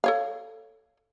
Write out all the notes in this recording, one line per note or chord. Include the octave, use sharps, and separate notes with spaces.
A4 C#5 F5